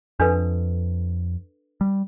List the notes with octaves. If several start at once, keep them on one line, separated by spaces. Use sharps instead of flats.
F2 D4 A4 B4
G3